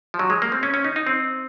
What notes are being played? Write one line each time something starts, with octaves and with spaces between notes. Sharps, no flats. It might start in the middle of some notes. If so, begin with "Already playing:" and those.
F3
F#3
G#3
A#3
C4
C#4
C#4
D#4
D#4
C4